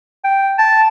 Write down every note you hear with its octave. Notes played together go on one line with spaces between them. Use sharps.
G5
A5